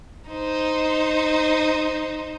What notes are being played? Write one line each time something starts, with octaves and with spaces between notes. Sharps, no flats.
D#4 C5